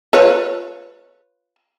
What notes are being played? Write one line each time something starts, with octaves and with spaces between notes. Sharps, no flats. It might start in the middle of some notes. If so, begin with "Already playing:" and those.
F4 B4 C#5